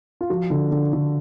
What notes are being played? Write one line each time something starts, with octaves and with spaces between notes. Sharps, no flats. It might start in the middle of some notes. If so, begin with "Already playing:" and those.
F4
F3 F#4
D3
D3
D3